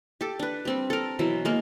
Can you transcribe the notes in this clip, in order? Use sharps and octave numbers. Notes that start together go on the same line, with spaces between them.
G4 A4
D4 B4
G3 C4 G4
A4 A#4
B2 E3 F#3 E5
G#3 A#3 A4 A#4